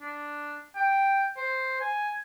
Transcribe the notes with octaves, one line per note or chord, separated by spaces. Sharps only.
D4
G5
C5
G#5